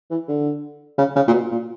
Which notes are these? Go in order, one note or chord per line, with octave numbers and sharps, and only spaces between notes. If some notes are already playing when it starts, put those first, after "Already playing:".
E3
D3
C#3
C#3
A#2
B2
A#2